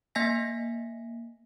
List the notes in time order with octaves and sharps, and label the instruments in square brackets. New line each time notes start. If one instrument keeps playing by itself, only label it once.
[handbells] A#3 E5 G#5 A#6 B6